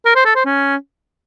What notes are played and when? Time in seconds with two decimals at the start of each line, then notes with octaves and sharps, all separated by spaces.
0.05 A#4
0.15 C5
0.25 A4
0.35 C5
0.45 C#4